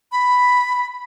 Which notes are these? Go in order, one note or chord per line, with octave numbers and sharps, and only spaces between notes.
B5